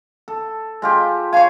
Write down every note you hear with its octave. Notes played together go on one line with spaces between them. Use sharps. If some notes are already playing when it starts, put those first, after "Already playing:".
A4
G#3 F4 G4
C#5 F5 G#5